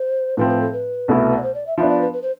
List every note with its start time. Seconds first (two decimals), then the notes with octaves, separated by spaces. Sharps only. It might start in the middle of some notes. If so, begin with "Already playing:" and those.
Already playing: C5
0.37 A2 F3 C4 B4
0.49 B4
0.61 A4
0.73 B4
1.08 C2 B2 A3 E4
1.37 D5
1.43 C5
1.54 D5
1.67 E5
1.78 F3 B3 D4 E5
1.90 D5
2.02 B4
2.13 B4
2.22 C5